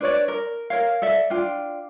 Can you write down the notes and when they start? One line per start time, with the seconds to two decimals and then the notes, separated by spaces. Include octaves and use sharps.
0.01 D4 B4 C#5 D5
0.28 A#4
0.70 A#4 C#5 F5
1.02 A4 D5 E5
1.30 D4 F4 G5